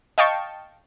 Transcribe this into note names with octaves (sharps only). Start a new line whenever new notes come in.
D#5 F5 G5 A5 C#6